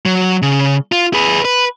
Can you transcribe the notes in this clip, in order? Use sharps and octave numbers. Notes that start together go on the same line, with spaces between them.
F#3
C#3
F4
G#4 B4
B4